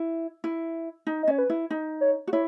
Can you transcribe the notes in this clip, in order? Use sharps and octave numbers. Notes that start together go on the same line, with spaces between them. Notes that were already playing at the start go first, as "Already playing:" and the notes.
Already playing: E4
E4
D#4
D#5
C#4 C#5
B4
E4
D#4
C#5
F#4
E4 C#5